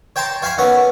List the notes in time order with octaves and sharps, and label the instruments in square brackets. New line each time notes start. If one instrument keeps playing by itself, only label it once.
[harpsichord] C#5 G5 A5 A#5 C6
C#5 F5 G#5 B5 C#6
D#2 B3 C#4